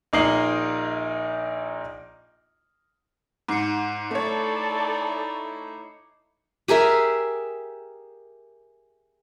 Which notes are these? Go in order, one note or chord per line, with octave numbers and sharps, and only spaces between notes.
A#1 A#3 D#4 D#5 C7 F#7
G#2 D6 C7 C#7
A3 D#4 E4 A4 C#5 D5
G4 G#4 A#4 E5